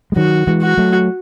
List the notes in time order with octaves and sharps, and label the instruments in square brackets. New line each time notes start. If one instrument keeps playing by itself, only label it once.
[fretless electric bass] G#3
[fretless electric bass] D#3 F#3 [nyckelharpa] F#4
[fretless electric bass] E3 G#3
[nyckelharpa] F#4
[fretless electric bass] F#3 A3